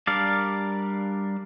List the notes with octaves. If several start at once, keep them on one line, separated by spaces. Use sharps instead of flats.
G3 D4 A#4 D5 F5